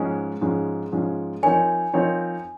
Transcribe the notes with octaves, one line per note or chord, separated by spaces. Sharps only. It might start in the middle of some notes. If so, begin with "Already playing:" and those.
Already playing: G#2 F3 G#3 C#4 G#4
G#2 F3 G#3 C#4 G#4
G#2 F3 G#3 C#4 G#4
F3 C4 D#4 A#4 C#5 G#5
F3 C4 D#4 A#4 C#5